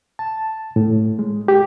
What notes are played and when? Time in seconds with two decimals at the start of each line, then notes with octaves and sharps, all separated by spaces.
0.19 A5
0.76 A2
1.19 G#3
1.48 G4